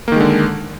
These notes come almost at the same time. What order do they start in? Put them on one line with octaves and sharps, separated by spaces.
A#3 D#3 G#3 D3